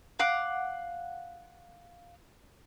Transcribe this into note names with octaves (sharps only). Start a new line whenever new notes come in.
F5 F#5 D6